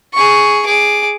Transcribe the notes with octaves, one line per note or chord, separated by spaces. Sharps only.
G#4 C#6
G#4 D6